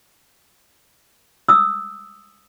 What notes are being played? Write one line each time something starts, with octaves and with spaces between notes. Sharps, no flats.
D#6 E6